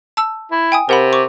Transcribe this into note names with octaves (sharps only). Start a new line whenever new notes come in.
A5 E6
E4
G5 G#5 D#6
C3 A#4 F#5 B5
C#6 D6